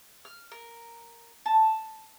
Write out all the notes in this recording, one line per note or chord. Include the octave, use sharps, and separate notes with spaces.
F6
A#4
A5